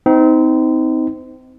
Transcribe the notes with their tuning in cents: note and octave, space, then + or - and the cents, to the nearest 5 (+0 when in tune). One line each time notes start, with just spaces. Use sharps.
C4 -25 D#4 +20